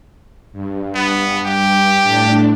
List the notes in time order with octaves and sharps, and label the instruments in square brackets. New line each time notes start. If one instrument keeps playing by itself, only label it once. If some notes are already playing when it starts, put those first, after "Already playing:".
[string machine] G2
[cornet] B3
G4
[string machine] A2 D4